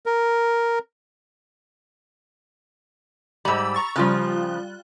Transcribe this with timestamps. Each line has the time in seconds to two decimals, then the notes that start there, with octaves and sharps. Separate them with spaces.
0.06 A#4
3.45 G#2 G3 B5 E6
3.75 A#5 C#6 A6
3.96 C#3 F3 G3 F4 F#6